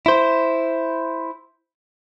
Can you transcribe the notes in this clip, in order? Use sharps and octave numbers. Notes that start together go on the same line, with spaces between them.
E4 C5